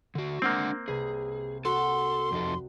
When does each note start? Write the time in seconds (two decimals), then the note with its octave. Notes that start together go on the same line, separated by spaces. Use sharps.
0.15 D3 F#4
0.42 G#3 A#3 C4 D4 F#5 D#6
0.88 C2 G#4 B4
1.65 F#4 A4 A#4 C6
2.32 F2 D#4 A4